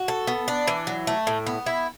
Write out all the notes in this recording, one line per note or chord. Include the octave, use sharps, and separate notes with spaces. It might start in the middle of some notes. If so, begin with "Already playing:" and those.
Already playing: F#4
A4
B3
D4
E3
F#3
A3
A2
B3
E4